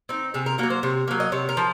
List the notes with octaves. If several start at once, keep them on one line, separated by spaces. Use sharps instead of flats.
C4 D#4
C3 G#4
A#4
F#3 A#3 F#4
C5
C3 C#5
F#3 A#3
D#5
C3 C#5
A#4
F3